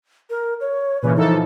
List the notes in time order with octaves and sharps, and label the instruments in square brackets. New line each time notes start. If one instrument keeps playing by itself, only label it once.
[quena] A#4
C#5
[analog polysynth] A#2 C#3 E3 [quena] B4
[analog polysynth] E3 F3 A4 [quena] D#4